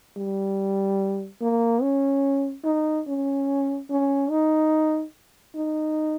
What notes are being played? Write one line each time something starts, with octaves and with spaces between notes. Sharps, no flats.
G3
A#3
C#4
D#4
C#4
C#4
D#4
D#4